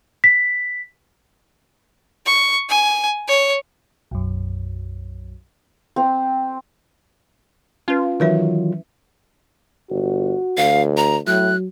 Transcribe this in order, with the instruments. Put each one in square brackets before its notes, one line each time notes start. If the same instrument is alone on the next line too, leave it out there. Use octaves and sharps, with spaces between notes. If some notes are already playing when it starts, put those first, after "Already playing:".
[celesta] B6
[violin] C#6
G#5
C#5
[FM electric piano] B1 F#2
[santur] C4
[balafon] C#4 B4 [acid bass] F4
[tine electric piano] D#3 E3 F#3 [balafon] E4 B4 E5
[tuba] G1 [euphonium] F#4
[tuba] D2 [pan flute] F5
[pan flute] A#5
[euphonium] A2 [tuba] F#3 [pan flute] F#6